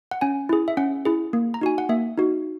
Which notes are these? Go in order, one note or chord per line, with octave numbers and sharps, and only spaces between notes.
F#5
C#4 G#5
E4 G#4
E5
C#4 F#5
E4 G#4
A#3
A#5
D#4 F#4 G#5
F#5
A#3 E5
D#4 F#4